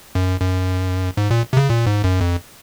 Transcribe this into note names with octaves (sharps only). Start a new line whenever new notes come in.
F#2
F#2
G#2
A#2
C3
C#3
A#2
G#2
F#2
F2